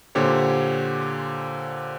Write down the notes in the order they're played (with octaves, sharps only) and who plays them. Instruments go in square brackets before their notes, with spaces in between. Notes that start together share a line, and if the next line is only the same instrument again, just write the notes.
[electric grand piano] A#2 D3 G4 C5 C#5